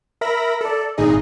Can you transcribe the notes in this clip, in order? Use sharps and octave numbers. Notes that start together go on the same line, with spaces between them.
A#4 E5 B5 A#6
A4 D5
G#1 A#2 D#4 G#4 D#5